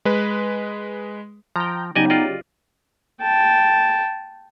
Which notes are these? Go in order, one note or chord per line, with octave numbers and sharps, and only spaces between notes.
G#3 B4
F3 G5 A#5
C#3 F#3 B3 D#4 G4 D5 D#5 G#5
F4 D5 D#5
G5 A5